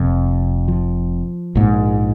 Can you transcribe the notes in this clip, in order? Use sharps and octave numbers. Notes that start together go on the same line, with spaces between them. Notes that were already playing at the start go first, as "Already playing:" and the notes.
Already playing: F1 F2 C3
F3
A#1 G#2